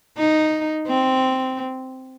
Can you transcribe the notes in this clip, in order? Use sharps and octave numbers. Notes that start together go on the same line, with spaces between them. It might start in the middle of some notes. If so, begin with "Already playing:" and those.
D#4
C4